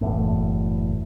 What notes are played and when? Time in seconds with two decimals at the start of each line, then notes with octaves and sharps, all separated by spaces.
0.01 F#1 E2 A2